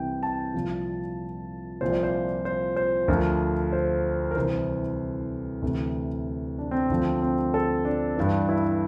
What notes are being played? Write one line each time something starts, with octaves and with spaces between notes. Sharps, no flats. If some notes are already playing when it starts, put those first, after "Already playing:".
Already playing: C2 C3 E3 G5
A5
C2 A#2 F3
C2 A#2 F3 C5
D5
C5
C5
C5
D2 D3 F3 A#4
C5
A#4
C2 C3 E3 C5
D2 C3 E3
D4
C4
D2 D3 F3
C4
C4
A4
D4
G2 E3
E4